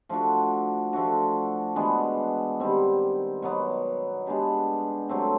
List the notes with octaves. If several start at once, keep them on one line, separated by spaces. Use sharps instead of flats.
F3 A3 D4 F#4
F3 A3 D4 F#4
E3 G#3 B3 D4
D#3 G3 C4
B2 F#3 B3
G#3 B3 D4 G4
F#3 A3 C4